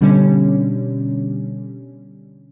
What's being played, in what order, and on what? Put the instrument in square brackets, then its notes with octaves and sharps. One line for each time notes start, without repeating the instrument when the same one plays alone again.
[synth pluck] B2 D3 G3 C#4